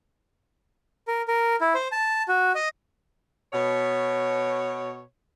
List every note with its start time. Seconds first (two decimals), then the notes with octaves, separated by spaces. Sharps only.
1.08 A#4
1.28 A#4
1.61 E4
1.74 C5
1.92 A5
2.28 F#4
2.55 D#5
3.53 B2 C#5